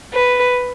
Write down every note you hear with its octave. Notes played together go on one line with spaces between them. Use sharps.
B4